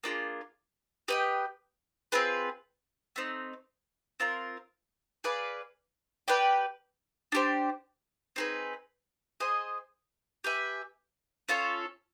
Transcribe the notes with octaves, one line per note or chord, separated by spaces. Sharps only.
A#3 D4 F4 G#4
G4 B4 D#5 G5
C4 F4 G#4 B4
A3 C4 D#4
C4 F4 A#4
G#4 B4 D5 F5
G4 B4 D5 G5
D4 G4 C5
C4 D#4 G#4 B4
G#4 C5 D#5 G#5
G4 B4 E5 G#5
C#4 F4 A4 C#5